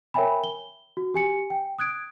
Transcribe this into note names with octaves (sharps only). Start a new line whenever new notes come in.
A#4 C#5 E5 G5 G#5 B5
G7
F#4
G4 G#5 C#7
G5
D#6 F#6 G#6 D7